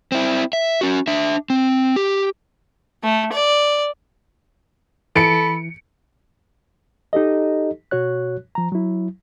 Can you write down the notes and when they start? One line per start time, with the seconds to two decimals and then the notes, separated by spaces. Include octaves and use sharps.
0.12 C4 E4
0.53 E5
0.81 C#4 F#4
1.07 D4 E5
1.50 C4
1.96 G4
3.04 A3
3.33 D5
5.16 E3 A4 B5 C#7 D7
7.13 D#4 G4 A4 D#5
7.91 B2 F#4 C#5 F#6
8.55 F3 A#5
8.72 F#3 E4